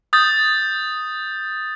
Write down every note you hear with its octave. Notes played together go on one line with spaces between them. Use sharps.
D#6 G6 A6